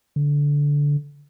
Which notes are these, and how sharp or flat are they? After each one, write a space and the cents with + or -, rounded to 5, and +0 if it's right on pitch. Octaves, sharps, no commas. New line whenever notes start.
D3 -15